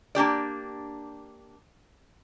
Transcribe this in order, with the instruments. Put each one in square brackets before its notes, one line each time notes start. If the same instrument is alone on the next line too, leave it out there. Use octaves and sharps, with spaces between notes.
[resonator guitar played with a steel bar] A#3 D4 G4 D5